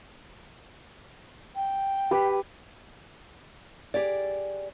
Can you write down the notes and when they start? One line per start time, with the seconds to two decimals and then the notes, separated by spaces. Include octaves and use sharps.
1.55 G5
2.11 G4 B4
3.94 G4 G#4 D5